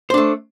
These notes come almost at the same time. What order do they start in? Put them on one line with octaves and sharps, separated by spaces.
C5 D4 A3